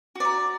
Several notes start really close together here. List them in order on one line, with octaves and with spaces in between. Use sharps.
F#4 D5 A#5